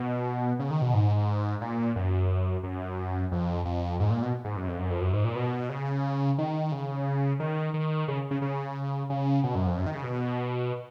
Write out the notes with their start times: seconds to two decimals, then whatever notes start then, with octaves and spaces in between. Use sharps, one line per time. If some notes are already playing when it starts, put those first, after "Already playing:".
Already playing: B2
0.59 C#3
0.71 D#3
0.82 B2
0.94 G#2
1.61 A#2
1.96 F#2
2.63 F#2
3.32 F2
3.65 F2
4.00 G#2
4.10 A#2
4.22 B2
4.45 G#2
4.56 F#2
4.68 F2
4.79 F#2
4.90 F2
5.01 F#2
5.13 G#2
5.25 A#2
5.36 B2
5.69 C#3
6.38 D#3
6.72 C#3
7.40 D#3
7.74 D#3
8.08 C#3
8.31 C#3
8.42 C#3
9.10 C#3
9.44 B2
9.55 F#2
9.67 F2
9.78 F#2
9.86 D#3
9.95 C#3
10.03 B2